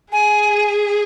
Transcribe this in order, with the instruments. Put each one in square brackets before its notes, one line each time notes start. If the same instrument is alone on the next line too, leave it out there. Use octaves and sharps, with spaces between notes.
[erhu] G#4 [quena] G#5